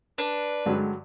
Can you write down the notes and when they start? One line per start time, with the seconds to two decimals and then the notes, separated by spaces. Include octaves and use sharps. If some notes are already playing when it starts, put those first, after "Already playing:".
0.18 D4 B4
0.66 G2 D3 F#3 G#3